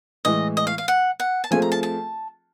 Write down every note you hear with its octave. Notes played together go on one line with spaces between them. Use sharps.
A2 E3 G#3 D#5
D#5
F5
F5
F#5
F#5
A5
F3 A3 C4 F4 G#4 G#5
A#5
A5
A5